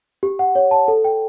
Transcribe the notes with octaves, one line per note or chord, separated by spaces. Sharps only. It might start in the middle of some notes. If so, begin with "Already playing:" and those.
G4
F#5
C#5
A5
A4
G5